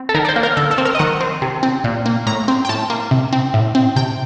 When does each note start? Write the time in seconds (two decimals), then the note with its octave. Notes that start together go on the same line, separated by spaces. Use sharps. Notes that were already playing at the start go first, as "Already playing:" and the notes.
Already playing: C4
0.09 A4
0.14 D#3 A#4
0.25 D5
0.29 C5
0.36 A#3
0.43 A#4
0.57 D3 A4
0.71 A4
0.78 C4
0.85 A#4
0.95 D#5
0.99 D#3 F#5
1.21 C4
1.42 C3
1.63 C4
1.84 A#2
2.06 A#3
2.27 A2 A#5
2.48 C4
2.65 G5
2.69 A2 A5
2.90 A#3
3.11 C3
3.32 C4
3.54 A2
3.75 C4
3.96 C3 G5